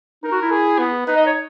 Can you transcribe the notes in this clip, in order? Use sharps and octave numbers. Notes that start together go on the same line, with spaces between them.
D#4 A#4
F#4
E4
G#4
B3
D#4 B4
D#5
C#5